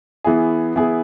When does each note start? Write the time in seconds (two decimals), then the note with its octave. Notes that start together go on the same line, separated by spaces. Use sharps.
0.24 E3 B3 E4 G#4
0.76 E3 B3 E4 G#4